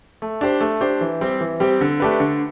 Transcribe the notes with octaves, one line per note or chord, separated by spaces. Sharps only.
A3
D4 G4 C5
A3
D4 G4 C5
E3
G3 C4 G4
E3
G3 C4 G4
D3
A3 D4 G4 B4
D3